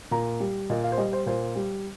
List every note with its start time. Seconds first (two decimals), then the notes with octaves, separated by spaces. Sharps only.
0.11 A#2 A#5
0.40 G3
0.70 A#2 D#5
0.84 F5
0.92 C5
0.98 G3 D#5
1.13 C5
1.26 A#2 C5
1.56 G3